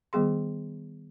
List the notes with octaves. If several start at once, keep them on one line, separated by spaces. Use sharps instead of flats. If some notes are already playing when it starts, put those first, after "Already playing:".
D#3 G3 B3 G#4 C6